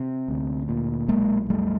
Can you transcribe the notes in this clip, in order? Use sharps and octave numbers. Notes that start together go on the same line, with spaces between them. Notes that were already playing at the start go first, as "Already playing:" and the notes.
Already playing: C3
D2
A#2
B1 G#3 A#3
F2 G3 A3